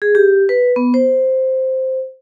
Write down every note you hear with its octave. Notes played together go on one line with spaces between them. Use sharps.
G#4
G4
B4
B3
C5